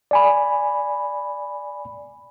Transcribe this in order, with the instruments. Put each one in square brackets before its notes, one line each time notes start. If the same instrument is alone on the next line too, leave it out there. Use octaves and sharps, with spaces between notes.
[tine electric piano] D5 G#5 B5